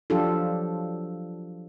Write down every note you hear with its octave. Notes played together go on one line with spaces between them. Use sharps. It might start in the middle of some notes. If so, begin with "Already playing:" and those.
F3 F#3 D4 F4 G4 A4